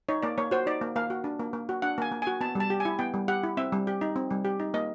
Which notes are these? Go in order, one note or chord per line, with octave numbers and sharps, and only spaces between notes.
D#4 C#5
A#3 D5
A#3 C#5
F#4 C5
D#4 D5
A#3
A#3 F5
F#4
D4
A#3
A#3
F#4
D4 F#5
A#3 G#5
A#3
F#4 G#5
B3 A5
G3 A5
G4
G#5
E4
B3 G5
G3
G4 F#5
E4
C4 E5
G3
G4
D#4
C4
G3
G4
D#4
A#3 D#5